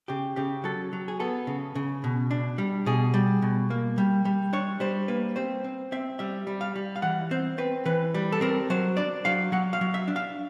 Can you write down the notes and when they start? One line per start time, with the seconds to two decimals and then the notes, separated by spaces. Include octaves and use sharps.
0.08 C#3 G4
0.36 C#3 G4
0.64 F#3 A4
0.93 F#3
1.08 G#4
1.20 B3 A4
1.47 C#3
1.75 C#3
2.04 B2
2.31 D4
2.58 G3
2.86 B2 G#4
3.14 G3
3.42 B2
3.70 A#3
3.98 G3
4.25 G3
4.53 D4 C#5
4.80 G3 C5
5.08 A#3 B4
5.36 C4 C5
5.64 C4
5.92 C4 E5
6.19 G3 E5
6.47 G3
6.61 F5
6.76 G3
6.96 F5
7.02 E3 F#5
7.31 C4 C5
7.58 C4 B4
7.86 E3 B4
8.14 G3
8.32 A4
8.41 C4 A#4
8.70 F#3 C5
8.97 D4 D5
9.25 F#3 F5
9.52 F#3 F#5
9.73 F5
9.81 F#3
9.94 E5
10.08 D4
10.16 F5